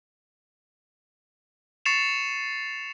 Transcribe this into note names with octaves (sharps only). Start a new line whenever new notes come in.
C#6 A6 C7 C#7 E7 F7